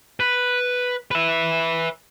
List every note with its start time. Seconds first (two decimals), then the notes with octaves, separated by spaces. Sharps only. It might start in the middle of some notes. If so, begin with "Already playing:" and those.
0.20 B4
1.11 B4 E5